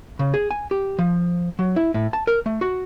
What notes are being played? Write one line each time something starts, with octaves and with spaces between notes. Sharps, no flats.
C#3
G#4
G#5
G4
F3
F#3
E4
A2
A5
A#4
A3
F#4